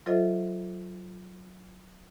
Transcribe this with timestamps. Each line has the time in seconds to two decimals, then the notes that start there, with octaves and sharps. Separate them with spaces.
0.06 F#3 F4 A4 C5 D#5 E5